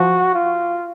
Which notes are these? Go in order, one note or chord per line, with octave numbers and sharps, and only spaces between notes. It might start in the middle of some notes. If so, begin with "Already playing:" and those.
Already playing: F3 F#4
F4